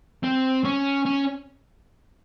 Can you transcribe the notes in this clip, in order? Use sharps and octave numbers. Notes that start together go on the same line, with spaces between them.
C4
C#4
C#4